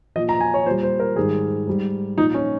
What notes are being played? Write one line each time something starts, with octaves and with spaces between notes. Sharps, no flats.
A#2 F3 D#5
A#5
G#5
C#5
A#2 G3 C5
C5
A#4
G#2 D#3 G3 G#4
G#2 G3
A#2 F3 D#4
C#4